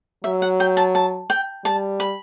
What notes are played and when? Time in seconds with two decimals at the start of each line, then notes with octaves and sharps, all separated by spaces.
0.24 F#3 E5
0.42 F#5
0.60 G5
0.77 A5
0.95 A5
1.30 G5
1.64 G3 A5
2.00 B5